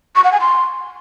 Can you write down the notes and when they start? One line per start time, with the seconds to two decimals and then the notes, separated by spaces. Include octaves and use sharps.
0.16 C#6
0.24 F#5
0.32 G#5
0.41 C6